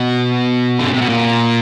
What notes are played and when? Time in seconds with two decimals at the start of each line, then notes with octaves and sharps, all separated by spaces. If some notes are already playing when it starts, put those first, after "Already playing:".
Already playing: B2
0.79 D3
0.87 C#3
0.93 C3
1.01 B2
1.09 A#2